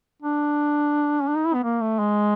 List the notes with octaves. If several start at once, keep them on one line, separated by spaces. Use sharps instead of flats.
D4
C#4
D4
D#4
E4
B3
A#3
A3
G#3